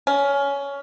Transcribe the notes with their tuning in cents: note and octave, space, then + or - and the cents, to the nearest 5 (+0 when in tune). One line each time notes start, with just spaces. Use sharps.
C#4 +15